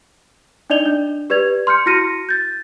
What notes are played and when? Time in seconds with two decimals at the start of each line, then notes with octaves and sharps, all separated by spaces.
0.70 D4 D#4 D5 D#5 F7 G7
0.86 D4
1.30 G4 B4 D5 G#6 F7
1.67 C6 F6 G6 C#7
1.86 E4 F#4 F6 A#6 C#7 D#7
2.29 G6 A6